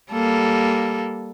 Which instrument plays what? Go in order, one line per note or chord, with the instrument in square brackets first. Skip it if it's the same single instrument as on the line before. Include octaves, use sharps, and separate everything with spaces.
[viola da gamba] G3 A#3 A4